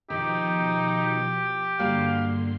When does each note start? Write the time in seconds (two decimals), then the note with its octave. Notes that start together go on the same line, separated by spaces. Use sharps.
0.10 B2 D#3 F3 D#4 G4
1.79 G2 D3 G3 A#3 F#4 F5 C6